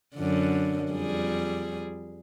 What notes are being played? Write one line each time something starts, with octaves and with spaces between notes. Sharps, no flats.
F#2 D3
F2 G3 G#4